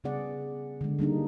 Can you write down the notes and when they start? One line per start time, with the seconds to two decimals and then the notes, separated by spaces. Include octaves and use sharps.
0.04 C#3 G3 B3 G#4 D5 F#5
0.81 D3 G#3
0.99 G3 A#3 D4 D#4